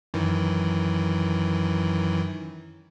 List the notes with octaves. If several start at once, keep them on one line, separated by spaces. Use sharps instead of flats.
F#2 D#3 E3